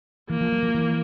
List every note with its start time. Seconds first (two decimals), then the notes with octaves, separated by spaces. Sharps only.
0.30 E3 A#3
0.41 F3
0.52 F#3
0.63 F3
0.74 E3